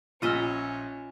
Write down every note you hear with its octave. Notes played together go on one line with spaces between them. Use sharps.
A#1 C#4 F4 D#5 E5 F6